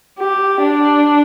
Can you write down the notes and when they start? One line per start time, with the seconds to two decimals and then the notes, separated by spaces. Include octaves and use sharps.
0.20 G4
0.62 D4